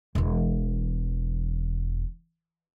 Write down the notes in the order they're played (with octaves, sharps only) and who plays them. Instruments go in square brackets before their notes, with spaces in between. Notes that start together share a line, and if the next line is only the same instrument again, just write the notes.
[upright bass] E1 E3